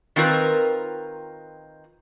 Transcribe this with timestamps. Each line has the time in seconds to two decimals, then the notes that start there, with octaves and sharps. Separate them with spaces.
0.16 D#3 C4 F4 A#4 B4